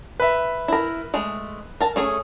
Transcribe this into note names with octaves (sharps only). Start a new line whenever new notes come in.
B4 E5
E4 A#4
G#3 A3
A#4 A5
A3 C#4 G#4